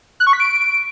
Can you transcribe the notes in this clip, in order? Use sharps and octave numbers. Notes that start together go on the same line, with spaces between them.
F#6
C#6
B6
D7